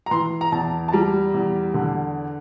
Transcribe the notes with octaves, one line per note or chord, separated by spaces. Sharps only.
A#5
E3 C6
A#5
E2 A5
A5
G3 A#5
E2
D3